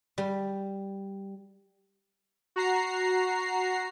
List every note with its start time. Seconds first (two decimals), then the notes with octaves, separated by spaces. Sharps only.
0.18 G3
2.56 F#4 A#5 C7